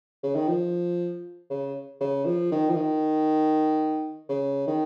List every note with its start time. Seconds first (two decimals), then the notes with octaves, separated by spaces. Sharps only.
0.23 C#3
0.35 D#3
0.48 F3
1.50 C#3
2.00 C#3
2.25 F3
2.52 D#3
2.69 F3
2.76 D#3
4.29 C#3
4.67 D#3